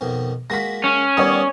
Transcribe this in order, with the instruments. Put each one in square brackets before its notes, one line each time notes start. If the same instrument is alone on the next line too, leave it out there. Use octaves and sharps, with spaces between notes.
[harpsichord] F2 B2 D#3
[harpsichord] G#3 A#3 F#4 [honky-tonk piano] A#6 B6
[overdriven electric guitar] C#4
[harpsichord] D#3 G3 B3 [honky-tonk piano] C#5 D5 D#6